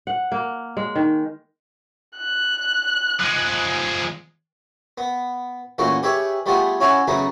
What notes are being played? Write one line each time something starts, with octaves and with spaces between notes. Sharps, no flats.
F#5
A#3
G#3
D#3
F#6
F3 G#3
B3
E2 A#2 A3 C#4 F#4 F5
G4 G#4 B4 C#5 E5
G3 A3 B3 F4 G#4
C#4 E4 F#4 C#5 F5 G#5
C#3 F#3 A3 B3 D#4